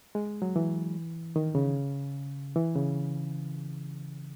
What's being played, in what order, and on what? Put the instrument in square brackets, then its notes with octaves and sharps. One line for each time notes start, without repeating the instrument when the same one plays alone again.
[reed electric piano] G#3
F#3
E3
D#3
C#3
E3
C#3